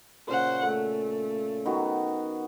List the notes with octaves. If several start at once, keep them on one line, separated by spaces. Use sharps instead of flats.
A#2 C#3 C5 F#5
A3
D#3 B3 F#4